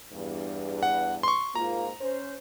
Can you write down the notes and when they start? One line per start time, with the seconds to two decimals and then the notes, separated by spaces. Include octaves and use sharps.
0.13 E2 G2
0.83 F#5
1.23 C6 C#6
1.55 G#2 A#3 F4 A#5
2.01 C#4 C5